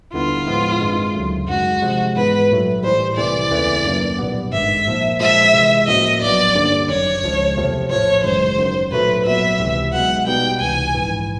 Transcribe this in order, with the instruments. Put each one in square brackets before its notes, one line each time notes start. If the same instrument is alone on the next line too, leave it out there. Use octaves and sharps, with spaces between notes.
[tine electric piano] D#2 D3 G3 B3 E4 [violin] F4
[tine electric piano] A2 F3 G#3 B3 E4
G2 D#3 G#3 C4
D2 C#3 F#3 A3
[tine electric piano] F#2 D#3 G#3 [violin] F#4
[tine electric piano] C3 F3 G#3
[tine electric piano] G#2 E3 G#3 B3 D#4 [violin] B4
[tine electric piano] A#2 F#3 A3
[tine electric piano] A2 E3 G3 [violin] C5
[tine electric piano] C2 C3 E3 A3 [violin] D5
[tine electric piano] D#2 C#3 E3 A3 C4
F#2 D#3 F#3 A#3 C#4
B1 A#2 G3 B3
[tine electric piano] G#1 G2 D#3 G#3 [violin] E5
[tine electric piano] A#2 F3 A#3 D#4
[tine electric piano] A#2 F3 G#3 [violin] E5
[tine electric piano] C3 E3 G#3
[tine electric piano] A2 F3 A#3 C#4 F#4 [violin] D#5
[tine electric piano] A#1 A#2 F#3 B3 [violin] D5
[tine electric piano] G2 D3 G3 A#3 C#4
[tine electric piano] G1 F#2 D#3 [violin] C#5
[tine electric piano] C#2 C#3 F3 G#3
E2 C3 F3 A3 C4
[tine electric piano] A#1 A2 F3 A3 [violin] C#5
[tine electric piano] G1 F#2 C#3 E3 G#3 [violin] C5
[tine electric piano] F#2 D#3 F#3
[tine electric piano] B1 A#2 F#3 A3 [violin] B4
[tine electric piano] A#2 F#3 B3 [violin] E5
[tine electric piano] C#2 C3 E3
[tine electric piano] B1 B2 G#3 [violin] F#5
[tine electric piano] B2 G3 B3 D#4 [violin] G5
[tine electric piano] C#2 C3 E3 [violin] G#5
[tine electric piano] A#1 G#2 E3